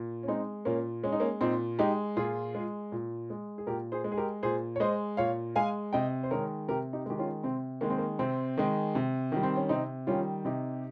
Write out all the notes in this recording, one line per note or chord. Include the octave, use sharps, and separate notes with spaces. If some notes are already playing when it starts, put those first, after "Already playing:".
Already playing: A#2
C#4
G#3 C4 D#4
A#2 A#3 C#4
G#3 C#4
D#4
A#3 C#4
A#2 C4 D#4
G#3 D#4 G4
A#2 F4 G#4
G#3
A#2
G#3
G#4
A#2 G4 A#4
G#4 C5
G#3
G#4
G4 A#4
A#2 G#4 C5
C#5
G#3 C5 D#5
A#2 C#5 F5
G#3 F5 G#5
C3 D#5 G5
C5
D#3 G#3 A#4 C#5
C3 G4 A#4
D#4 G4
D#3 G#3 G4
C#4 F4
C3 C4
D#3 G#3 A#3
C4
A#3
C3 C4
D#3 G#3
C3
D#3 G3
C4
C#4
C3 C4 D#4
D#3 G3 C#4 F4
C3 D#4 G4